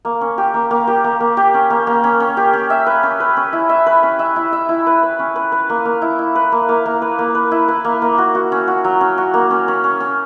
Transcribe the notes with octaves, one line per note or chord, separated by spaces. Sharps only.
A#3
C#4
G4
A#3
A#3
G4
A#3
A#3
G4
C#4
A#3
A#3
C#4
C#4
G4
C#4
E5
B4
C#4
B4
C#4
E4
E5
B4
C#4
E5
E4
E5
E4
B4
B4
C#4
B4
B4
A#3
A#3
E4
E4
B4
A#3
A#3
A#3
B4
A#3
B4
E4
B4
A#3
A#3
F#4
F#4
C#4
F#4
F#3
C#4
F#4
A#3
C#4
C#4
C#4
C#4